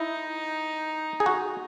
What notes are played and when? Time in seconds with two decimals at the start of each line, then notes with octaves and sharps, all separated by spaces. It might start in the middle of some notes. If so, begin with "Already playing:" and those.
Already playing: D#4 E4
1.20 G#4
1.26 F#4